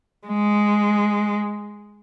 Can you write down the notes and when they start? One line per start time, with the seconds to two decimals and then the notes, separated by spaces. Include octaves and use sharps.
0.27 G#3